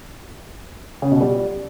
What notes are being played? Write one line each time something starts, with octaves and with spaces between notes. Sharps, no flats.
C#3
B2
G3